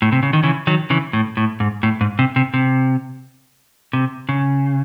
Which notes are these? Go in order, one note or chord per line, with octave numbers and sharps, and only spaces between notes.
A2
C3
C#3
D#3
C#3 E3
D#3 F#3
C#3 E3
A2
A2
G#2
A2
G#2
C3
C3
C3
C3
C#3